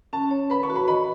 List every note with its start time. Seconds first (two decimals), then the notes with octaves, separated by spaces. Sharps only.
0.13 C#4 A5
0.31 C#5
0.50 B4 B5
0.63 C#6
0.70 F#4
0.76 B5
0.88 D#5 B5